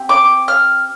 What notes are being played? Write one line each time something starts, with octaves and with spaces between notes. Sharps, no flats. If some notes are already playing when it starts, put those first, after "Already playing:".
Already playing: C4 G4
D6
F6